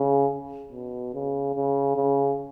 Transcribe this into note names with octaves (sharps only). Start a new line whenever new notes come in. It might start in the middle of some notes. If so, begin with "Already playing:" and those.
Already playing: C#3
B2
C#3
C#3
C#3